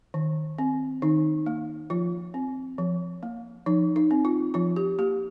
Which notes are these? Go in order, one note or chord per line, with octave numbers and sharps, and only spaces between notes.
D#3
C4
D#3 D#4
A#3
F3 F4
C4
F3
A#3
F3 D#4
D#4
C4
F4
F3 F4
G4
A#3 G4